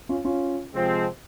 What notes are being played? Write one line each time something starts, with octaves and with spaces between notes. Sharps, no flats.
C#4 F4
C#4 F4
C3 F3 G#3 C4